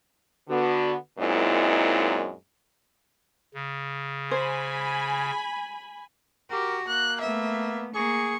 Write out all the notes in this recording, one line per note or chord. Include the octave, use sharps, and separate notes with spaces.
D3 B3 F#4
F#2 A#2 G#3 C4 D#4 E4
C#3
C5 G#5 B5
F#4 G4 A#4
A#3 F#6
A3 B3 E5
A#3 G#4 C#6